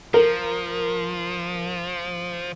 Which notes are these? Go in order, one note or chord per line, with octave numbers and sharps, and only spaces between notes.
F3 A#4